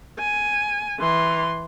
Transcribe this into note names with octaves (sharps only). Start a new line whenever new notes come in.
G#5
E3 C6